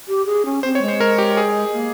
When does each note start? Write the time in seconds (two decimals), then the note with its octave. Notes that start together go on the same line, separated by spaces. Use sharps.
0.08 G4
0.26 G#4
0.46 C#4
0.63 C4 C5
0.75 C#5
0.82 G#3
0.88 C5
1.00 A#4
1.18 G4
1.37 G#4
1.73 A#3